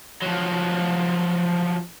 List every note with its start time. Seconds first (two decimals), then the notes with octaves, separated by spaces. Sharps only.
0.22 F3 F#3